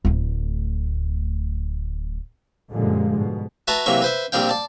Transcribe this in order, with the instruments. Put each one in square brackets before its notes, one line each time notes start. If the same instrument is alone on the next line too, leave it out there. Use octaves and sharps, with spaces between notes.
[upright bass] D1 D2
[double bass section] F#2 A#2 D3 F3 G3 G#3
G#2 B2
[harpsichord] F#4 B4 E5 F#5 A5 A#5
C3 E3 F#3 A#3 E5 C#6
B4 C5 E5
A#1 A#2 G3 C4 F5 G5
D5 A5